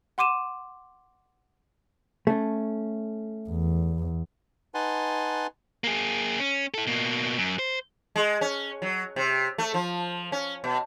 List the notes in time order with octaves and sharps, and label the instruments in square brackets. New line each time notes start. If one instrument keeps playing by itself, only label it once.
[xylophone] F#5 C6 D6 D#7 E7
[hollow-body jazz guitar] A3 C#4
[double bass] E2
[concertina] D#4 B4 F#5 G#5 A5 C6
[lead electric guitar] A#3 G#4
C#4
E4 A4
B2 A#3
F#2
C5
[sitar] G#3
C#4
F#3
C3
A3
F3
C#4
B2